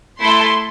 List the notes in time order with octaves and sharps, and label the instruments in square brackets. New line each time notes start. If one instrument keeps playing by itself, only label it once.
[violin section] A3 E4 A4 C6